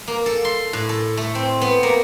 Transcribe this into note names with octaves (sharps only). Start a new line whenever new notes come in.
A#3
A4
C6
A2
A4
A3
C4
B3
A#3